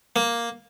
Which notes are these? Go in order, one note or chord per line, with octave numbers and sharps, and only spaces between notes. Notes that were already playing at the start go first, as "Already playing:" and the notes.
A#3